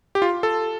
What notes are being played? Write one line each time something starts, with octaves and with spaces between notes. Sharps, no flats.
G4
F4
A4